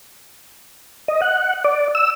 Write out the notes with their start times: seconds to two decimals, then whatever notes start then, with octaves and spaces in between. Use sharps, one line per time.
1.08 D#5
1.22 F#5
1.64 D5
1.95 E6